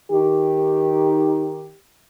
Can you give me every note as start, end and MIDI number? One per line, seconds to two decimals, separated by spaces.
0.11 1.69 51
0.11 1.69 63
0.11 1.69 67